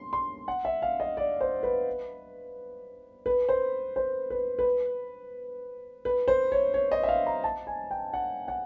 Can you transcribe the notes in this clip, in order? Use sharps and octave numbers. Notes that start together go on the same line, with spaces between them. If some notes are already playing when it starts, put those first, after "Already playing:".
Already playing: C6
C6
F#5
E5
F5
D#5
D5
C5
B4
B4
C5
C5
B4
B4
B4
C5
C#5
C#5
D#5
E5
F5
A#5
A5
G#5
G5
F#5
F#5